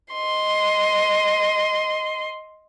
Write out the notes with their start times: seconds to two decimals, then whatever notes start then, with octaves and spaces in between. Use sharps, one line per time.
0.13 D#5 C6